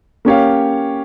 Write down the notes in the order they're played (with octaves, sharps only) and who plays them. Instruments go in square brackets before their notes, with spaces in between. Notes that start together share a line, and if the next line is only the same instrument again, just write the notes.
[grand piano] A#3 C#4 G4 C#5 F5